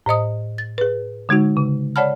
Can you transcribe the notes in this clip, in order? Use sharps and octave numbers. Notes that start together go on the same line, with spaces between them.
A2 C5 D#5 D#6
A6
G#4 B4
D3 G#3 D#4 F#4
C#3
C#5 D5 F#5 A5 B5 F6